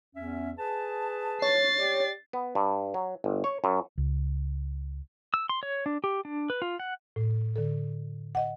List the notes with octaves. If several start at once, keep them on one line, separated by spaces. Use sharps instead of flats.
E2 C#4 E5
G#4 B4 A5
C#5 A6 C7
G4 D5
B3
G2
F#3
G1
C#5
F#2
C#2
E6
C6
C#5
D4
G4
D4
B4
F4
F#5
A2
D3 A4
D#5 F#5